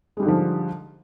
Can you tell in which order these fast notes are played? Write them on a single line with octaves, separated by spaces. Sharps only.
G#3 G3 G#2 D3 F3